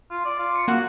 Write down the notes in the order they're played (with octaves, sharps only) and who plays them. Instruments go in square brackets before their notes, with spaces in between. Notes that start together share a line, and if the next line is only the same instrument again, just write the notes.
[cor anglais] F4
D5
F4
[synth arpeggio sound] C#7
[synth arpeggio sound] A#3 F#5 [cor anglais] F#4